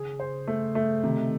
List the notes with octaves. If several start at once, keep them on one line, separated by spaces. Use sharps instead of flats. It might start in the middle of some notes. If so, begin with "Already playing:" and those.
Already playing: C#3 G#4
C5
A3
A3
C3 D#3